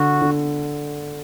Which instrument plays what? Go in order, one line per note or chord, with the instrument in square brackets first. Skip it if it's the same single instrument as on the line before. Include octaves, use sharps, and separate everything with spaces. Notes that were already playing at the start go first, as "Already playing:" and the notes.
Already playing: [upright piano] D3 [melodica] F#4
[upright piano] D3